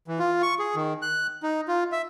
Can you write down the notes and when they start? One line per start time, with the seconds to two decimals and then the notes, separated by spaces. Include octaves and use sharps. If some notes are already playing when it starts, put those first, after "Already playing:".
0.08 E3
0.19 F4
0.43 C#6
0.59 G#4
0.76 D#3
1.02 F#6
1.43 D#4
1.68 F4
1.92 E5